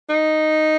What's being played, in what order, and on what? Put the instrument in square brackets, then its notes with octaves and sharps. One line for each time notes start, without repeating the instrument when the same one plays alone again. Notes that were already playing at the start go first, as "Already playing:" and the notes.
[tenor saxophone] D#4